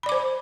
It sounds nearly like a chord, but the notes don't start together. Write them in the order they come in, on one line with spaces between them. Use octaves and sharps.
B5 D5 D6 C5